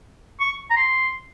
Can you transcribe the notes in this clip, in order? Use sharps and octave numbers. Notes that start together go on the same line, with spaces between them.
C#6
A#5
C6